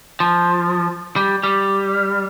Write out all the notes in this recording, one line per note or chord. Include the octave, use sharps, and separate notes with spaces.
F3
G3
G3